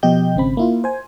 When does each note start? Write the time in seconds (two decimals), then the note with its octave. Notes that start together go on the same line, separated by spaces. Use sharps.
0.03 B2 F3 G4 D#5 G5 G6
0.36 G#1 C#3 C4 B5
0.57 A#3 E4 F4
0.84 C5 G#5